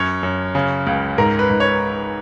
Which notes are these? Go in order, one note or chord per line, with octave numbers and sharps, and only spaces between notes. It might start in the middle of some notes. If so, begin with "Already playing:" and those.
Already playing: F#2 C#5
F#2
C#3
C#2
G#2 A#4
B4
G#2
C#5